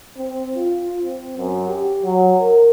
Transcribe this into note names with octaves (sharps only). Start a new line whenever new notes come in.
C4
F4
C4
F#2
G4
F#3
A#4